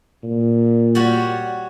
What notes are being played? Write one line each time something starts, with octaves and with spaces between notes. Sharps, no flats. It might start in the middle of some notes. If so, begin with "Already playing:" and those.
A#2
G3 F#4 C#5